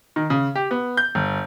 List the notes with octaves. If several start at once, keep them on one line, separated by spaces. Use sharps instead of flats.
D#3
C#3
G4
B3
G6
G1